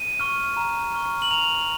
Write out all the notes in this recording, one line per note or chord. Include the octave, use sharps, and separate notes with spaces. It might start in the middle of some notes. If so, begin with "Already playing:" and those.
Already playing: D#7
C#6 F6
A#5
C#6 F6
F#7
A#5 F7